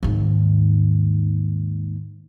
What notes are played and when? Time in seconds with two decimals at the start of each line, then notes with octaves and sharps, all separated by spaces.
0.03 D#2 G#2